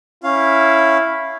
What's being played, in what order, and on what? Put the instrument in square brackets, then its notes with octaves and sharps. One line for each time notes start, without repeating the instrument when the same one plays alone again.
[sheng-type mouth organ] C#4 F5 [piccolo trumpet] E4